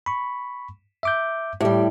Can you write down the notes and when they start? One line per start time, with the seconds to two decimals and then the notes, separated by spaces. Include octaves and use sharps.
0.06 B5 C#6
1.03 E5 D6 G6
1.61 A2 G3 G4 D6